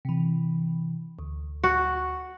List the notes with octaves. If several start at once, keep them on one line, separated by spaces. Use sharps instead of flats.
C3 E3
D2
F#4